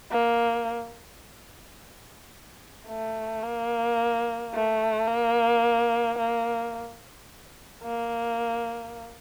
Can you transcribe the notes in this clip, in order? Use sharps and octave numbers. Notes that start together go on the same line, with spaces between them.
A#3
A3
A#3
A3
A#3
A#3
A#3